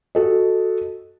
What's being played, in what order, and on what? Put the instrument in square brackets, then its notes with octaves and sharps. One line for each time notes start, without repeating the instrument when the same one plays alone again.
[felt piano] F#4 A4 D#5